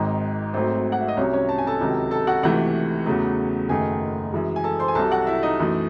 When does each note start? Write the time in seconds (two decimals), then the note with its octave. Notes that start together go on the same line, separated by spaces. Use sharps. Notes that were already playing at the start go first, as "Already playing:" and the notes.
Already playing: G#1 G#2 D#3 C4
0.54 G#1 G#2 F#3 A3 C4 C5
0.92 F#5
1.00 E5
1.08 D#5
1.17 C2 C3 F#3 C#4 C#5
1.33 C#4 C#5
1.49 A5
1.58 G#5
1.67 A4 A5
1.80 C#2 C3 D#3 F#3
2.11 A4 A5
2.27 F#4 F#5
2.43 C#2 C3 E3 A3 F#4 F#5
3.06 E2 C#3 F#3 A3
3.69 F#1 F#2 D#3 A3 G#4 G#5
4.33 F#2 E3 G#3
4.56 G#5
4.64 A4 A5
4.79 C5 C6
4.88 G#5
4.95 C2 C3 F#3 A4 A5
5.11 F#4 F#5
5.27 E4 E5
5.43 D#4 D#5
5.59 F#2 E3 A3